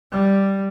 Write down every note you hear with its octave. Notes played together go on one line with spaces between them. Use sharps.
G3